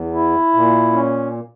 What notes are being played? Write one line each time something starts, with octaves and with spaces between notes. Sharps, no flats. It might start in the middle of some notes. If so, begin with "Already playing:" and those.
Already playing: E2
E4
A#2
C#4